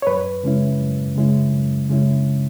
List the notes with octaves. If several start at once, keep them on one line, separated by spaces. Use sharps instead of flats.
C#5
F#2 B4
C#3 G#3 C#4 E4
F#2
C#3 G#3 C#4 E4
F#2
C#3 G#3 C#4 E4